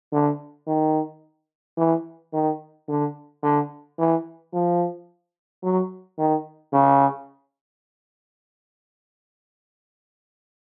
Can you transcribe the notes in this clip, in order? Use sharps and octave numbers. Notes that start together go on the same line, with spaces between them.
D3
D#3
E3
D#3
D3
D3
E3
F3
F#3
D#3
C#3